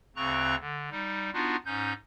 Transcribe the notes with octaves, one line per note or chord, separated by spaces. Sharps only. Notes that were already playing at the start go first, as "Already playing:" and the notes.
D2 C#3 C4 A#5 C#6 F#6
D3
G3 D#4
B3 D4 D#4 F4 F#4
G#2 C#4 D#4 G6